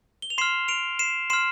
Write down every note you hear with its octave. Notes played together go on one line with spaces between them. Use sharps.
G7
F7
C6 F6 C7 E7
D7 F7
C7 E7
C6 F6 C7 E7